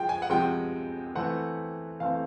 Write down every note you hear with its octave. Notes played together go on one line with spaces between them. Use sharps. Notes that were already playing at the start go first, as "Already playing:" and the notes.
Already playing: F3 G#3 G5
G#5
F#5
C3 F3 G#3 G5
E3 A3 C4 F#5
E3 A3 C4 F5